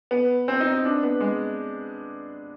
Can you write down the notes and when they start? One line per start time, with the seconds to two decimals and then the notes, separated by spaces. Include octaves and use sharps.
0.11 B3
0.48 C4
0.60 D#4
0.72 D#4
0.85 D4
1.03 B3
1.21 G#3